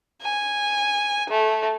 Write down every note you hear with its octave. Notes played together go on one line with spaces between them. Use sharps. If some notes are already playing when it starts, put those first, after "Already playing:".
G#5
A3